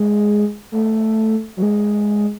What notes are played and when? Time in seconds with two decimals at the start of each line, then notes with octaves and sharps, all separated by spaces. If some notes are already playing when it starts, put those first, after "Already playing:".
Already playing: G#3
0.72 A3
1.57 F#3
1.62 G#3